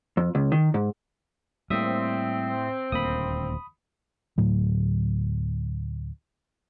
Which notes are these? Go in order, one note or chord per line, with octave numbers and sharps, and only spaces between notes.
F2
C#2
D#3
G#2
A2 G3 A#3 C4 E5 D#6
D#1 D2 A#3 B5 D#6
D2 A2 F#3